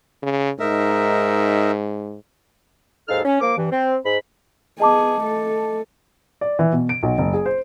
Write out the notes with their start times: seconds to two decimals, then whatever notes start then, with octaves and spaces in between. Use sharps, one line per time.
0.23 C#3
0.60 G#2 D#4 A#4 E5
3.09 D#2 G#2 D#4 A4 F5 F6
3.25 C#4
3.41 F3 A#3 D6
3.57 G2 E3
3.72 C4
4.05 G#2 B5
4.80 B3 G#4 D#5 A5 D6
5.22 A3 A4
6.41 D5
6.59 E3
6.72 B2
6.89 D7
7.03 B1
7.18 F#1
7.34 G#4
7.46 C5